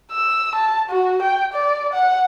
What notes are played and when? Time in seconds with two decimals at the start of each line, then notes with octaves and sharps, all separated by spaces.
0.11 E6
0.55 A5
0.90 F#4
1.22 G5
1.53 D5
1.93 F#5